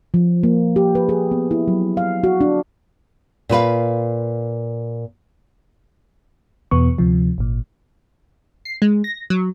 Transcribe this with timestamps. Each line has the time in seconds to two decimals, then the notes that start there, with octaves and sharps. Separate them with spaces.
0.14 F3
0.43 A#3
0.76 G4
0.95 B4
1.09 G#4
1.31 B3
1.51 E4
1.68 F#3
1.97 F5
2.24 F#4
2.41 D4
3.49 A#2 F4 B4 F5
6.71 E2 B2 B3 C#6
6.98 D2 C3 F3
7.38 G#1 A#2
8.65 C7
8.82 G#3
9.04 A#6
9.30 F#3